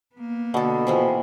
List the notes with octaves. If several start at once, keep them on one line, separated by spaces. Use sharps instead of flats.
A#3 B3
B2 D3 A4
C3 E3 F3